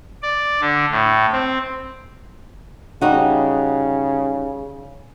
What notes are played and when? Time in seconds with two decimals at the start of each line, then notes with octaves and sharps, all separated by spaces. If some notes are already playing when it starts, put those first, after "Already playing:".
0.22 D5
0.61 D3
0.91 A2
1.32 C4
3.01 C#3 G3 D#4 F#4